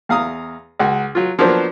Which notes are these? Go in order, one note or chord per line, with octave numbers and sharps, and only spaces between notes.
E2 F5 A#5 D#6
C#2 F#4
F#3 F4
F3 F#3 A#3 B3 D4 C5